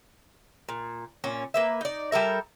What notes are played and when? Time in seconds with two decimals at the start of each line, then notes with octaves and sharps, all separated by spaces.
0.69 A#2
1.24 A#2 C#4
1.54 A#3 B4 E5
1.81 D#4 D5
2.12 G3 A4 A#4 E5